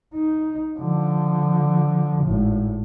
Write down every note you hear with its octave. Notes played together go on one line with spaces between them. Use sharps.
D#4
D3 F3
G#1 A2